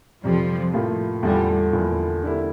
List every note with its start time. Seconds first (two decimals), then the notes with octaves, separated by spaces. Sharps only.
0.24 F2 C3 F3 G3
0.73 A2 F3 A#3 F4
1.23 E2 D3 F3 G3 A3 E4
1.73 E2 D3 F3 A#3 E4
2.24 D3 G3 A#3 E4